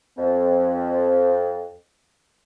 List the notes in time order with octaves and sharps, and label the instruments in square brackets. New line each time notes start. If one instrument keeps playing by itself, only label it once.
[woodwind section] F2 [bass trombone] C4